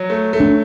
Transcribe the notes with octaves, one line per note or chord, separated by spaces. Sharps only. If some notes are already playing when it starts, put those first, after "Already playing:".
Already playing: F#3
A3
A3
D4